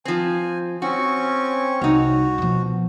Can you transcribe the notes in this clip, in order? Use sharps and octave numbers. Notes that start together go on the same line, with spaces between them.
F3 C4 G#5
C4 C#4 F#4 C#6
C2 D#4 F#4 C#5
B2 F3